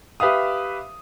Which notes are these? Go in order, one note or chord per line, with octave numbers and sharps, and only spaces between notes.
G4 B4 E5 F5 D#6